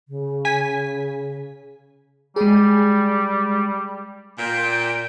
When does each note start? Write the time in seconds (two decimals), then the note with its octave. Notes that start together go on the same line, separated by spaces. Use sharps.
0.08 C#3
0.45 G#5 B6
2.36 G3 G#3 G#4
4.38 A#2 G5